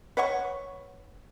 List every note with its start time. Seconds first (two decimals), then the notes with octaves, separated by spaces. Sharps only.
0.17 B4 C#5 F#5 C#6